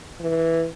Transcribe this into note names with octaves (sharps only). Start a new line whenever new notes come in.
E3